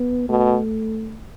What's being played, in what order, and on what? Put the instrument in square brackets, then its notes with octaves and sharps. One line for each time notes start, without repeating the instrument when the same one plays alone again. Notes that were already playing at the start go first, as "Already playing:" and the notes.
Already playing: [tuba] B3
[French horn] B2 [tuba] A3